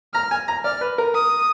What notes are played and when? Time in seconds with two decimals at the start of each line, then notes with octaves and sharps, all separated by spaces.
0.14 A#5 F6
0.31 G#5
0.48 A#5
0.64 D5 F6
0.81 B4
0.98 A#4
1.15 D#6